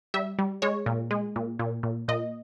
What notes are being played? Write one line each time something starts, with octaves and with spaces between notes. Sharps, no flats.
G3 E5
G3
G#3 C#5
A#2
G#3
A#2
A#2
A#2
A#2 D#5